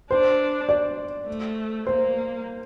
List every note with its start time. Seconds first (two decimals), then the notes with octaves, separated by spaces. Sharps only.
0.11 D4 C5
0.69 D5
1.27 A3
1.87 A#3 C5